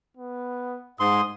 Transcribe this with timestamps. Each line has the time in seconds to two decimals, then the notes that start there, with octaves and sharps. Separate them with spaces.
0.17 B3
1.00 G#2 C6 D#6